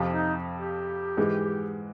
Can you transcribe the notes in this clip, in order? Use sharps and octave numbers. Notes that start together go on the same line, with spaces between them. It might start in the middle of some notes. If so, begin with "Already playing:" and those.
Already playing: F2 C3 F3
D#4
G4
G#2 E3 G#3